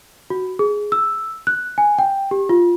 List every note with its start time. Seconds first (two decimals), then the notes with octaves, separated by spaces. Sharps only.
0.30 F#4
0.59 G#4
0.92 E6
1.47 F#6
1.78 G#5
1.99 G5
2.31 G4
2.49 F4